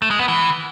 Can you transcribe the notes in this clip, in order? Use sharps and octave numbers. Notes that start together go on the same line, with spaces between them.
A3
G#3
B3
E3